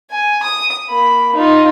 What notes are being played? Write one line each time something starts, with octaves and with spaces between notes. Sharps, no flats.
G#5
D#6
A#3 B5
D#4 F4